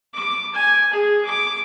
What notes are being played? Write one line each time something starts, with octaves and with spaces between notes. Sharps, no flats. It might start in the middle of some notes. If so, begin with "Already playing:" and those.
D6
G#5
G#4
D6